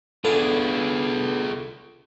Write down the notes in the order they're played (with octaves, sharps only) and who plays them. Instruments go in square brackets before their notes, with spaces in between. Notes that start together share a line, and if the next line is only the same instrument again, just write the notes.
[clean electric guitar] B3 D4 E4 [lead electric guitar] F4 G#4 [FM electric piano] A4